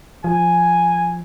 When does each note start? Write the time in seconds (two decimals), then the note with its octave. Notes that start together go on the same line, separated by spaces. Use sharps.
0.24 F3 G#5